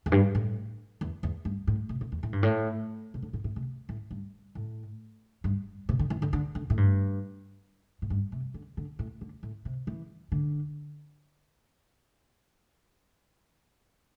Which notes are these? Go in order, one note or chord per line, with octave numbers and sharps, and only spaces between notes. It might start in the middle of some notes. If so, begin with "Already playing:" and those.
E2
G2
A2
E2
E2
G2
A2
C3
A2
E2
A2
G2
A2
C3
D3
A2
A2
C3
A2
G2
A2
G2
C3
D3
E3
D3
D3
D3
A2
G2
A2
G2
C3
D3
D3
A2
D3
A2
C3
E3
D3